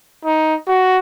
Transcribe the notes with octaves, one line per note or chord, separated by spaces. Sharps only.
D#4
F#4